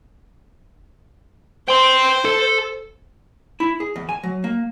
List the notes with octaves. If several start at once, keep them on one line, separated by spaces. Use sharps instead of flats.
C5 G5 C6
A4
E4
G#4
E2
G#5
F#3
A#3